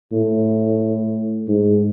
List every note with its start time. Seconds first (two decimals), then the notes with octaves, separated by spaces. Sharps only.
0.13 A2
1.48 G#2